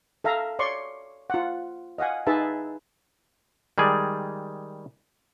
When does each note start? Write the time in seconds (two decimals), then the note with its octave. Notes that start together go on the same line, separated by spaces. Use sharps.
0.24 A4 E5 F5 A#5
0.59 C#5 D5 C6 C#6
1.30 F4 F#5
1.98 D#5 F5 F#5 G#5
2.27 D#4 G#4 B4 E5 A5
3.78 D#3 G3 G#3 G#4 D5